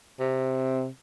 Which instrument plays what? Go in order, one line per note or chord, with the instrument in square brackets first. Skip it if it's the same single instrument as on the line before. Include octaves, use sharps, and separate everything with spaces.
[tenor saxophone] C3